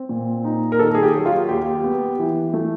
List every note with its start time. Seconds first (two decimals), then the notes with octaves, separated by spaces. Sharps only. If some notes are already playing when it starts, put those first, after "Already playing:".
Already playing: C4
0.09 A#2
0.44 D#4
0.72 A#4
0.79 D#3 A4
0.95 G#4
1.03 G4
1.15 F#3
1.26 F4
1.49 D#2 G4
1.84 B3
2.19 E3
2.54 A3